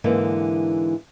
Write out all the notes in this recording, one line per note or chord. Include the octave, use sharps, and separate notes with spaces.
G#2 D3 E3 A#3